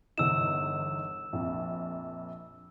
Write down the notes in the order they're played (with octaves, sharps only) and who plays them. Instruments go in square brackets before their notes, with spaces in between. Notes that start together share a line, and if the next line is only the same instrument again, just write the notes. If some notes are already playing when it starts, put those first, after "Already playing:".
[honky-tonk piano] G1 E2 D#4 [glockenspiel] E6 E7
[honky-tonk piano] A#1 F2